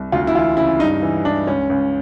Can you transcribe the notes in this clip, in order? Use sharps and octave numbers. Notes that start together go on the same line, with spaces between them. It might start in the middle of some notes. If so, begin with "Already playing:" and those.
Already playing: C2
D2 F4
E4
E3 F4
C#3 E4
G2 D#4
E3
E3 D4
C#2 C#4
C#2